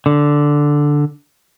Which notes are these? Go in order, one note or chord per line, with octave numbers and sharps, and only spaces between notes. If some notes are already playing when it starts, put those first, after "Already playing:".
D3